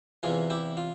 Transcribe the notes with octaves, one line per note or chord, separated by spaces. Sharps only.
E2 C3 E3 F4 G#4
E4 G4
F4